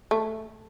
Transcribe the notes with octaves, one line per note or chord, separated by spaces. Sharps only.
A3